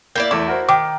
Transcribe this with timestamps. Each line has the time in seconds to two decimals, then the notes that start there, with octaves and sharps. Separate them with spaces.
0.16 A#3 E4 D5 G6
0.31 E2 A3 E4 D6
0.47 F#4 A#4 C5
0.69 D#3 D6